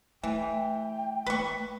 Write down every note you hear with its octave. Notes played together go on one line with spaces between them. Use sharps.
E3 A3 G5
A3 A#3 B4 C#6